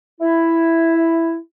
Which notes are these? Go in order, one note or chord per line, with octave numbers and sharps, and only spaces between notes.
E4